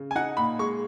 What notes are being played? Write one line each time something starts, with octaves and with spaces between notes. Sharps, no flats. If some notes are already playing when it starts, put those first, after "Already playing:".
Already playing: C#3
G#5
D#4 F#5
A#2 B5
G#3 C#6